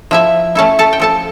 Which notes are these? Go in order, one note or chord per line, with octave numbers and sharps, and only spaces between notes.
F3 E4 E5
A3 C#4 E4 A4 A5
A4 A5
G5
F3 A4 A5